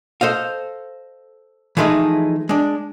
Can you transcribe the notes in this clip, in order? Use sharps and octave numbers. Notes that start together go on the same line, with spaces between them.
A4 C5 D#5 F5
E3 F3 G#3 A3 D#4
G#3 D4